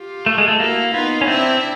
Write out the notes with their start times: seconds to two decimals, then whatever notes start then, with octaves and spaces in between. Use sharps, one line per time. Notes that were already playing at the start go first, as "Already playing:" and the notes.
Already playing: F4 G4
0.26 A3
0.38 G#3
0.48 A3
0.60 A#3 E4 F#4
0.94 B3 D#4 F4
1.21 C#4
1.28 C4 D4 E4